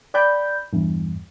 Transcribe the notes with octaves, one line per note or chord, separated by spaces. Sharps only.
D5 G5 B5 G6
E2 G2